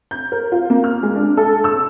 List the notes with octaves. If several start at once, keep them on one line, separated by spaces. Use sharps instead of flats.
G6
A#4
F4
A#3
F6
G#3
D4
A4
E6